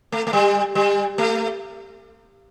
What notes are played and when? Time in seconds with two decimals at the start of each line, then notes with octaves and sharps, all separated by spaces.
0.12 A3
0.27 A3
0.33 G3
0.75 G3
1.18 A3